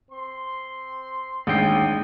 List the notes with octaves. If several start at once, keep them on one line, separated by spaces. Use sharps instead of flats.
C4 C6
A1 D#2 G#3 D4 G#4 G5 C7